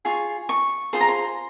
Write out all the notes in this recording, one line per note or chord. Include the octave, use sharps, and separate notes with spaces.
F4 G#4 C#6
C#6
F4 G#4 C5 C6
A#5
C6